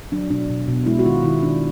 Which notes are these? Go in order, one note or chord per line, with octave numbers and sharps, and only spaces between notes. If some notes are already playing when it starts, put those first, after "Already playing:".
F#3 D4
B2 D4
B2
B2
G#3 E4
F#4
D#3 F4
D#3 E4
D#3 D4